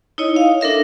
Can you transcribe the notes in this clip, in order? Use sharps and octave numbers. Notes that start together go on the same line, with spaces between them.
D#4 E4 C#5 D#5
F5
D4 A4 A#4 E5